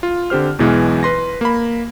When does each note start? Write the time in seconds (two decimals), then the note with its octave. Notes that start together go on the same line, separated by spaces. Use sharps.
0.03 F4
0.30 D3 C4 G4 C5 F6
0.58 B1 E2 B2 E3 G#3
1.03 B4 C6 A#6
1.41 A#3 B5